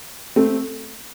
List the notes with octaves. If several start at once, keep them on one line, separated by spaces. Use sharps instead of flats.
A3 C4